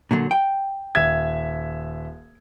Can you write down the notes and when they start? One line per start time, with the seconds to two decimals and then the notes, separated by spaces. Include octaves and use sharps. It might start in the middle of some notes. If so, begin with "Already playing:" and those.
0.11 A#2 D3 F#3
0.31 G5
0.95 D#1 E5 G#6